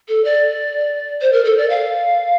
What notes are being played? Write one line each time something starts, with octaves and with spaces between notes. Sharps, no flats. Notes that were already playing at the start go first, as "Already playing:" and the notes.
A4
D5
C5
A#4
A4
D5
F5